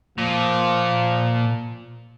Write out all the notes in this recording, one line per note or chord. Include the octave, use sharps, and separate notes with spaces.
A#2 F3